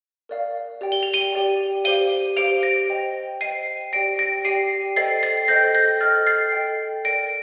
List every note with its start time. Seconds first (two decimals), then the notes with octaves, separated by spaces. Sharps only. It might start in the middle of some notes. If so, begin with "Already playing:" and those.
0.29 A#4 D5 F5
0.81 G4 D5 G5
0.92 G7
1.03 F7
1.13 D#7 G7
1.32 G4 D5 G5
1.85 G4 C5 F5 D#7 G7
2.36 G4 C5 F5 D7 F7
2.63 A#6 D7
2.89 C5 D#5 G5
3.41 C5 D#5 G5 C7 D#7
3.93 G4 D5 G5 A#6 D7
4.19 A#6 D7
4.45 G4 D5 G5 C7 D#7
4.96 A4 C5 D#5 G5 A6 C7
5.23 A6 C7
5.48 A4 C5 D#5 G5 G6 A#6
5.75 G6 A#6
6.01 A4 D#5 G5 F6 A6
6.27 A6 C7
6.52 A4 D#5 G5
7.05 A#4 D5 G5 A#6 D7